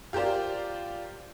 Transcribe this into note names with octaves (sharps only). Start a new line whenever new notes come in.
F4 G4 A#4 C5 D5